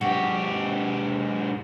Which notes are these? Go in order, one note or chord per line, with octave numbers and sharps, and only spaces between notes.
G#2 F#4 G4